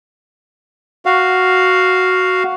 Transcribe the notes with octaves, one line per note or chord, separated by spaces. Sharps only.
F#4 F5